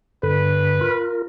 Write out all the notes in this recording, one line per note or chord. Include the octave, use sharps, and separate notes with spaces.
G2 D3 B4
F4 A#4